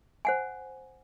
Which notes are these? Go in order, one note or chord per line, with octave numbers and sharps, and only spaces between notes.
C5 F#5 G#5